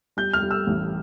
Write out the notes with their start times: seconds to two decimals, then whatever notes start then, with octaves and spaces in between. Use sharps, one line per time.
0.17 G3 G6
0.33 F6
0.42 G3
0.51 E6
0.67 A1